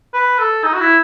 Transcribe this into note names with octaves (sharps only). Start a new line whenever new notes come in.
B4
A4
D#4
F#4
E4